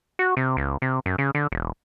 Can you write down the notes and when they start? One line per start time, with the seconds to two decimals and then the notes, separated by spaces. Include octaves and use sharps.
0.19 F#4
0.37 C3
0.57 C#2
0.82 C3
1.06 F#2
1.18 C#3
1.35 D3
1.52 E1